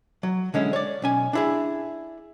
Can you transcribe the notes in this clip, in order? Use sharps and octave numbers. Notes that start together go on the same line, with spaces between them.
F#3
D3 G#3 C#4 E4
C#5 D5
B1 C#4 G#5
D4 E4 G#4